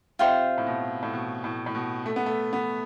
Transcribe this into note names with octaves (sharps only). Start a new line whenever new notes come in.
C3 F4 C5 E5 G5
A2
B2
A2
B2
A2
A2
B2
A3
B3
A3
B3